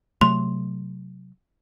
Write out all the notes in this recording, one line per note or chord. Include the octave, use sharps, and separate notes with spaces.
C3 F#3 A3 C6